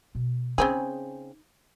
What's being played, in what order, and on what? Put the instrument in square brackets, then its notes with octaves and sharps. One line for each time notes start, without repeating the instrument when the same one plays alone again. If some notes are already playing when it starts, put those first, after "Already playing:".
[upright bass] B2
[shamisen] C#3 C4 G#4 [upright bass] D#4